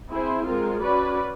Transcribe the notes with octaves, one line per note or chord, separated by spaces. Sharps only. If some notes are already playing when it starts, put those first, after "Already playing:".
C4 E4 G#4 C5
G#3 C4 F4 A#4
C#4 F#4 B4 D5